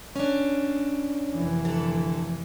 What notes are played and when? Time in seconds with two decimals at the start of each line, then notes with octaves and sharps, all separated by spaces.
0.16 C#4 D4
1.32 F1 E3
1.65 D3 A4